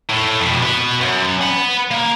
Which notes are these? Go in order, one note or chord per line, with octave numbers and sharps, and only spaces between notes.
A2
F2 B2
F#4 B4
F#2
F#5 B5
A#3